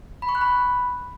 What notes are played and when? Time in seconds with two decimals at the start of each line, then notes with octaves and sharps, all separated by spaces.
0.22 B5
0.29 C#6
0.35 F#6
0.41 B5